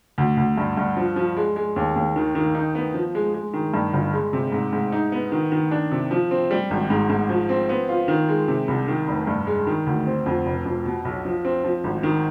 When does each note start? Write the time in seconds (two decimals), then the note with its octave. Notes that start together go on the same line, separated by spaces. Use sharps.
0.18 D2
0.37 D2
0.58 G2
0.77 G2
0.97 F3
1.16 F3
1.37 G#3
1.56 G#3
1.76 D#2
1.96 D#2
2.16 D#3
2.35 D#3
2.55 D#4
2.75 B3
2.94 F3
3.15 G#3
3.34 G#3
3.54 D#3
3.74 G2
3.93 G1
4.13 G#3
4.33 C3
4.52 G#2
4.73 G#2
4.92 D#4
5.12 B3
5.32 D#3
5.52 D#3
5.71 D4
5.91 C3
6.11 F3
6.31 C4
6.51 G3
6.71 G#1
6.90 G#2
7.10 G#2
7.29 F3
7.49 C4
7.69 B3
7.89 F4
8.08 D#3
8.29 G#3
8.48 C3
8.68 C2
8.88 D#3
9.08 F1
9.27 G2
9.47 G#3
9.67 D#3
9.87 D2
10.07 C4
10.26 F2
10.46 F1
10.65 F2
10.85 B2
11.05 B1
11.25 F3
11.45 C4
11.64 F3
11.84 G#1
12.03 D#3